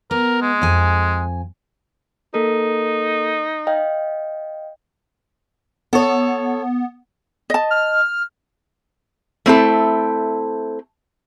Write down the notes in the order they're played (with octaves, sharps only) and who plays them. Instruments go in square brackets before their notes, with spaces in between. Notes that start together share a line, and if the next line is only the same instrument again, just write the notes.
[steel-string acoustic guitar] B3 [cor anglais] A#4
[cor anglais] G#3
[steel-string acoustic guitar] F2 G#5
[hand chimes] A#3 A4 A#4 [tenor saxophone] D#4
[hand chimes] D#5 F5 G5
[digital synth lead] B3 [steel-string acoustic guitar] A4 C#5
[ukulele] D#5 A5
[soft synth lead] F6
[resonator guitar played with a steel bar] A3 C4 E4 A4